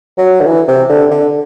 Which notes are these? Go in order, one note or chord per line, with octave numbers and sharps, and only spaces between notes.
F#3
D3
E3
C3
D3
D3